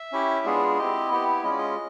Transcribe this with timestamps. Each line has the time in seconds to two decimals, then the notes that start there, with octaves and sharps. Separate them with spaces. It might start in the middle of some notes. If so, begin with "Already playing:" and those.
Already playing: E5
0.12 C#4 E4 G4
0.45 G#3 B3 D4 F4 G#4
0.78 C4 E4 G4 D#5
1.11 B3 E4 G4
1.44 G#3 C#4 F4 D#5
1.51 D5
1.58 D#5